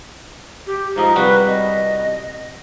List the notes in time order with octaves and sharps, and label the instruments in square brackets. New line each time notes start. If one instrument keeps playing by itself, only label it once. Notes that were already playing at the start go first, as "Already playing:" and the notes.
[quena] G4
[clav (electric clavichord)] G#2 F3 D#5 [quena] A#5
[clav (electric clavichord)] C2 G3 F#4 [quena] B4
[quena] D#5